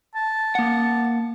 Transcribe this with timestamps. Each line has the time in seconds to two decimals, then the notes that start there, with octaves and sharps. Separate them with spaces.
0.16 A5
0.55 A#3 F#5